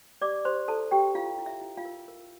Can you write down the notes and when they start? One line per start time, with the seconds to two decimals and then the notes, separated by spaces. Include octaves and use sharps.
0.21 G4 D5 D6
0.45 G4 C5 C6
0.68 E4 A4 A5
0.91 G4 G5
1.15 E4 F4 F5
1.39 E4
1.46 E5
1.61 E4
1.77 F4 F5
1.85 A#4
2.08 A#4